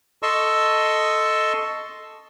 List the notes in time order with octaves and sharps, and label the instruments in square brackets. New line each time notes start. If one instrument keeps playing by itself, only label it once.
[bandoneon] A4 D#5 A5 C6 C#6 E6